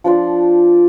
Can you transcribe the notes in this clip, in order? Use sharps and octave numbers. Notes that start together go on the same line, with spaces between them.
F3 D4 D5 C6